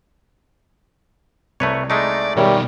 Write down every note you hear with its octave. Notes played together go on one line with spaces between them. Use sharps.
C2 A3 B4 C#5
G#3 A3 D#4 D5
B2 D#3 G3 A#4 C#5 E5